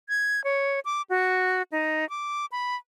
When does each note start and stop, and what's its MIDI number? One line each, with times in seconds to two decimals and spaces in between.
0.09 0.43 92
0.44 0.80 73
0.85 1.02 86
1.10 1.62 66
1.72 2.08 63
2.10 2.46 86
2.52 2.75 83